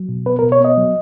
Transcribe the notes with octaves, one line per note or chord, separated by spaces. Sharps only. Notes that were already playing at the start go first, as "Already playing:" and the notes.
Already playing: F#3
B2
B3 B4
A#4
B2
C#5
B3 D#5
F#3